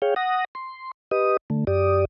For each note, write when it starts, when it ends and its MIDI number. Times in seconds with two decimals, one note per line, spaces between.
0.02 0.14 68
0.02 0.14 73
0.02 0.14 77
0.02 0.14 79
0.16 0.45 78
0.16 0.45 87
0.16 0.45 94
0.55 0.91 84
1.11 1.37 67
1.11 1.37 71
1.11 1.37 75
1.11 1.37 87
1.50 1.65 50
1.50 1.65 57
1.67 2.05 42
1.67 2.05 67
1.67 2.05 74
1.67 2.05 87